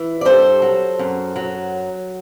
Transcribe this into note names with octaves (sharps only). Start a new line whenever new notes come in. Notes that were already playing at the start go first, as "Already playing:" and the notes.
Already playing: E3
D5
G2 A4 C5
F#3
F#2
F#3